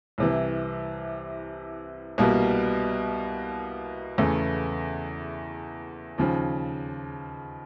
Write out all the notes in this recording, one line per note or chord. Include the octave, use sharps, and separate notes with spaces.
C2 C3 E3
C2 B2 G3 A#3
E2 C#3 E3 A3
D#2 C#3 F3